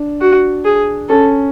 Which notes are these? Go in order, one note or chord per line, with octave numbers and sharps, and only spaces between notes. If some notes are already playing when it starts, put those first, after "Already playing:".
Already playing: D4
F#4
G#4
C#4 A4